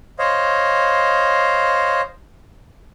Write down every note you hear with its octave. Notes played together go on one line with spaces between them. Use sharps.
C5 C#5 D#5 F5